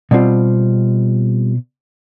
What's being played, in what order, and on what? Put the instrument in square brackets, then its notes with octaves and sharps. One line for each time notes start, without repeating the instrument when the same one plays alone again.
[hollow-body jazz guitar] B2 G3 C4 F4